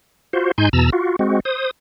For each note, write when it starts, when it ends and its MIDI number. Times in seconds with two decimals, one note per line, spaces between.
0.33 0.52 65
0.33 0.52 66
0.33 0.52 72
0.58 0.69 44
0.58 0.69 63
0.58 0.69 80
0.58 0.69 84
0.58 0.69 91
0.73 0.90 40
0.73 0.90 47
0.73 0.90 81
0.73 0.90 82
0.73 0.90 88
0.92 1.16 65
0.92 1.16 66
1.19 1.40 56
1.19 1.40 60
1.19 1.40 66
1.45 1.71 72
1.45 1.71 87